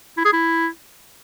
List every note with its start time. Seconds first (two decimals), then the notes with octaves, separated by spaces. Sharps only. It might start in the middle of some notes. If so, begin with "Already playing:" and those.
0.18 E4
0.25 G#4
0.33 E4